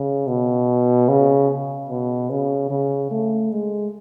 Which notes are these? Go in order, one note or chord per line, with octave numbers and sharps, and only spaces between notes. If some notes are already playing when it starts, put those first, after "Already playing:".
Already playing: C#3
B2
C#3
B2
C#3
C#3
A3
G#3